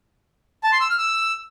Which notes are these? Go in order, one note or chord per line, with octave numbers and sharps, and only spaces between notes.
A5
C6
E6
F6
E6